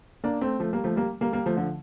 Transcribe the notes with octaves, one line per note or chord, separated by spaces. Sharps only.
A#3 D4
A3 C4
F3 A3
G3 A#3
F3 A3
G3 A#3
G3 A#3
G3 A#3
F3 A3
D3 F3